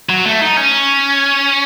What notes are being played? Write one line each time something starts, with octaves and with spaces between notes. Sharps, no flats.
F#3
A3
D#4
C#4